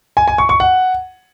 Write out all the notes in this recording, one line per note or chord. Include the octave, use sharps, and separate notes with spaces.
G#5
G#5
C#6
C#6
F#5